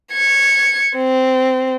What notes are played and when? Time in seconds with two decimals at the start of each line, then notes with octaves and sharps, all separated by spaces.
0.12 G#6 C#7
0.95 C4